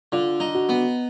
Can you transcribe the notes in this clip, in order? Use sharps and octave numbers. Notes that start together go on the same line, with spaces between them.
D3 F4
D#4
F#4
B3